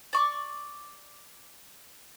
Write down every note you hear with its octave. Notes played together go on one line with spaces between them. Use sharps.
D5 C#6 D6